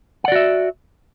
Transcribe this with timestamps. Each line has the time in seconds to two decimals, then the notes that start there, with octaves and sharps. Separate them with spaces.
0.24 F#5
0.28 D5
0.32 F#4
0.36 E5